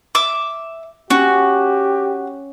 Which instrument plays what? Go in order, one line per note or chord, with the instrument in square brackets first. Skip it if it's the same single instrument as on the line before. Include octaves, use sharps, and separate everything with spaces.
[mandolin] E5 D6
[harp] C#4 [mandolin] F#4 [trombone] G4